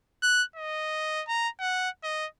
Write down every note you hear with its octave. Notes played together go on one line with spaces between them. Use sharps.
F#6
D#5
A#5
F#5
D#5